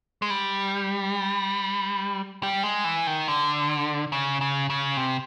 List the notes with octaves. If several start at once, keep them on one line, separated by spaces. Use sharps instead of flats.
G#3
G3
G3
G#3
E3
D#3
D3
C#3
C#3
C#3
C3